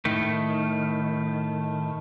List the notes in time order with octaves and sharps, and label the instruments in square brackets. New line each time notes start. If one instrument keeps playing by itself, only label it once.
[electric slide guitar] A2 D#3 A3